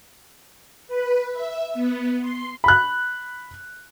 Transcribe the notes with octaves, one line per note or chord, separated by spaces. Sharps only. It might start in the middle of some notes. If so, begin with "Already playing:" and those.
B4
E5
B3
C6
B5 F#6